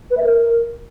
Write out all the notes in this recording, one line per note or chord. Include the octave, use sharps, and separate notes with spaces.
B4
E5
A#4